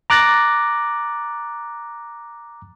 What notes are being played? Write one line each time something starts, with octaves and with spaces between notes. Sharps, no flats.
A#5 D6 F#6 A6 A#6